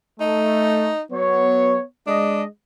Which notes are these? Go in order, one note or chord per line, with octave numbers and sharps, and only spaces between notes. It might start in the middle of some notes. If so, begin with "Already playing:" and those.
A3 D#4
F#3 B3 C#5
G#3 D4 D#5